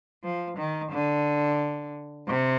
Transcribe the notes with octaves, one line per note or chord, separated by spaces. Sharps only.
F3
D#3
D3
C3